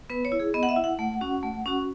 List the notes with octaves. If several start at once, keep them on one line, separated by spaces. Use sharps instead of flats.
B3 B4
C#5
E4
G#4
B3 D#5
F#5
E5
E4
F#5
A3
C#4 F#4
A3
C#4 F#4